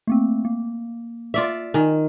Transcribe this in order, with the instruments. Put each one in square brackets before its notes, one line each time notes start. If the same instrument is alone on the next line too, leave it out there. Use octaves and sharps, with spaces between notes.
[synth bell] A3 A#3 C4
A#3
[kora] F4 D5 E5
[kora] D#3 [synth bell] G#5